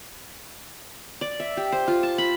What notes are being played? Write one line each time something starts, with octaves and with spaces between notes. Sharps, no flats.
D5
E5
G4
C5
F4
A5
B5